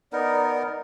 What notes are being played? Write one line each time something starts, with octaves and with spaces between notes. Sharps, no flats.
B3 D#4 A#4 D5